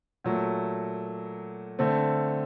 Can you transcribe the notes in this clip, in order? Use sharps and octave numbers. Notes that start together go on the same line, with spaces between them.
A#2 F#3 A3
D3 A3 C4